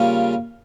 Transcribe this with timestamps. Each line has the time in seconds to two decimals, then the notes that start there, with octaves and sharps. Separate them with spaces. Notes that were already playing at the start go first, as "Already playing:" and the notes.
Already playing: C#3 G3 A#3 C#4 F4